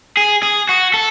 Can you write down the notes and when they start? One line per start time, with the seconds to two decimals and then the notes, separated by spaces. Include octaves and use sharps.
0.17 G#4
0.43 G#4
0.69 F#4
0.94 A4